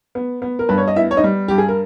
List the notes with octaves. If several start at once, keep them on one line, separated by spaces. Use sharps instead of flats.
B3
B3
A#4
G2 B4
C#5
D#5
B3 E4 E5
C#5
D#4 D#5
G3
G2 G4
G#4
A#4